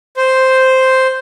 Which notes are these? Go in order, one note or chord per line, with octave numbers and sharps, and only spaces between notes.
C5